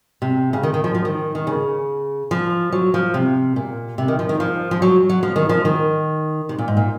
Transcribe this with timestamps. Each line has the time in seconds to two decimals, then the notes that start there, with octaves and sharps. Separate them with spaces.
0.22 C3
0.53 C#3
0.63 D#3
0.74 D#3
0.84 F3
0.95 F3
1.05 D#3
1.35 D#3
1.47 C#3
2.31 F3
2.72 F#3
2.94 F3
3.14 C3
3.56 A#2
3.98 C3
4.08 D#3
4.19 F3
4.29 D#3
4.40 F3
4.71 F3
4.82 F#3
5.09 F#3
5.23 F3
5.36 D#3
5.49 F3
5.65 D#3
6.49 C3
6.58 A#2
6.68 G#2
6.77 A#2